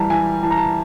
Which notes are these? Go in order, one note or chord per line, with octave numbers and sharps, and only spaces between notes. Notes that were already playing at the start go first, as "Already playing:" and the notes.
Already playing: E3 G3 A5 A#5
E3 G#5
E3 A5
A#5
A5